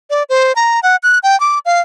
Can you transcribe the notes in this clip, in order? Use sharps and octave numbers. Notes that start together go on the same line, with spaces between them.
D5
C5
A#5
F#5
F#6
G5
D6
F5